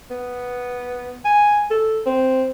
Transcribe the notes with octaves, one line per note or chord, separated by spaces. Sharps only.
B3
G#5
A4
C4